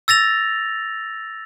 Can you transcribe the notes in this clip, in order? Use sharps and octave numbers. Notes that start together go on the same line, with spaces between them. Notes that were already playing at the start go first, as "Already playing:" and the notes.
E6 A6 A#6 F7